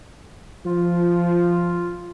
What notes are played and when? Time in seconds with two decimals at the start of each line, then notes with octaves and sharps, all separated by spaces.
0.66 F3 F4